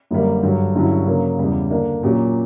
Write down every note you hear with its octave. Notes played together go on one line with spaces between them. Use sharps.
F#2 D3 G3 A#3
G2 D3 F#3
G2 D3 F#3 C#4 E4
C#3 F#3 A#3
E2 C#3 G3
D3 A#3 D4
A#2 F#3 C#4 G4